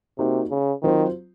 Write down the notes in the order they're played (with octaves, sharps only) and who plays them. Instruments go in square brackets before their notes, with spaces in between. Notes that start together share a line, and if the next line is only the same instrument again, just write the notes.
[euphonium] C3 [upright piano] A#3 D#4 F#4
[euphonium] C#3
[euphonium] D#3 [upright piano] F#3 C4 F4 C5